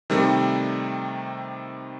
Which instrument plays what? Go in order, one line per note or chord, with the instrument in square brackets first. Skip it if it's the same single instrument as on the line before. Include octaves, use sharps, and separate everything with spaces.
[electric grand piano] C3 D#3 G3 A3